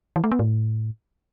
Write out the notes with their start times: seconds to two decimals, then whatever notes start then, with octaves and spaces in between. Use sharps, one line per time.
0.16 E3
0.24 A3
0.32 B3
0.39 A2